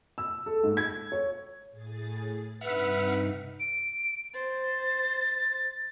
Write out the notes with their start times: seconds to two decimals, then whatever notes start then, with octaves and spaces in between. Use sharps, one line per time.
0.18 E6
0.46 A4
0.64 G#2
0.77 G#6
1.12 C#5
1.71 A2 G#4 A6
2.61 G2 C3 D#4 B4 E5 F#5 F6
3.60 D7
4.34 C5 A6